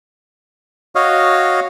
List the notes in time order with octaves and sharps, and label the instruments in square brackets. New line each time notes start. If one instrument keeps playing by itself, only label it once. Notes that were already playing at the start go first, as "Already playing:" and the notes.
[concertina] F#4 C#5 D#5 F5